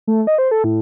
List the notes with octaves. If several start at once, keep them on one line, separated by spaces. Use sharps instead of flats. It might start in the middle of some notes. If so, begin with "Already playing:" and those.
A3
D#5
C5
A4
A2